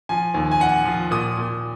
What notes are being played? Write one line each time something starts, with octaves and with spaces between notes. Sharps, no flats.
F3 G#5
D#2
G#5
F3 F#5
F3
A#2 D#6
A#2